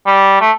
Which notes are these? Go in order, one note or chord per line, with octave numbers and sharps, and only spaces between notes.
G3
A3